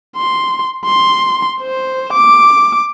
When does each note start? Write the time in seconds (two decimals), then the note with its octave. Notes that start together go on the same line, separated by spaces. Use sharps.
0.17 C6
0.85 C6
1.62 C5
2.13 D6